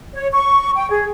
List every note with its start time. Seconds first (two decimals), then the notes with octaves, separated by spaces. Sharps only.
0.14 C#5
0.31 C#6
0.75 G5
0.90 G#4